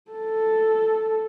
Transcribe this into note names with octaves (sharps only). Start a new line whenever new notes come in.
A4